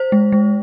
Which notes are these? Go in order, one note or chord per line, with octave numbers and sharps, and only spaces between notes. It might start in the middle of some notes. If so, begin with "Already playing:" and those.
Already playing: C5
G#3
G#3